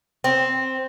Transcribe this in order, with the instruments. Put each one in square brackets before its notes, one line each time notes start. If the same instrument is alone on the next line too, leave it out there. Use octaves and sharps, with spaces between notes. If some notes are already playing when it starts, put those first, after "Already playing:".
[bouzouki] C4